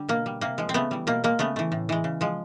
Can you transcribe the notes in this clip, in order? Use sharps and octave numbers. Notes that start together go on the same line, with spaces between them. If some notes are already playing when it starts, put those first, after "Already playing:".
Already playing: D3 G3 D4
B2 A#3
G3
C3 A#3
F3 G#3
C4
C#3 A3 B3
E3 G3
B2 A#3
G#3 A#3
C#3 A3 B3
E3 A3
A2
E3 G#3
C#3
F3 G#3